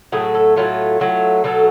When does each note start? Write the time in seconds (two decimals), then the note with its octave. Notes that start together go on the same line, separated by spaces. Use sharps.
0.12 A2 F#3 A3 G#4
0.34 A4
0.56 A2 F#3 A3 F4
1.00 A2 F#3 A3
1.44 B2 F#3 A3 A4